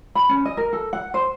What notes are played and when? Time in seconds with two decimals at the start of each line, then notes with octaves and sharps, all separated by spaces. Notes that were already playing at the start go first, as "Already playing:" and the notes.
0.15 B5
0.29 C#4
0.45 D#5
0.57 A#4
0.73 A4
0.93 F#5
1.14 C5